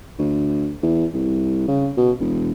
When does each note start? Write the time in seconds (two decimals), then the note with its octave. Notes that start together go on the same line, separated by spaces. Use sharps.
0.19 D2
0.83 E2
1.14 C2
1.68 C#3
1.97 B2
2.20 E1